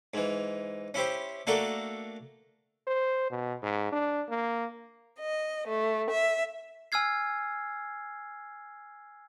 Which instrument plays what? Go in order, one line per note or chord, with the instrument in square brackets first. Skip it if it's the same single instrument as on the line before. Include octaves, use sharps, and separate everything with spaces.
[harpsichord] G#2 E3
C#4 E4 G4 C5
A3 A#3 D4 F#4 A4 A#4
[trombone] C5
B2
G#2
D4
A#3
[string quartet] D#5
A3
E5
[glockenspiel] G#5 E6 F6 G#6 C7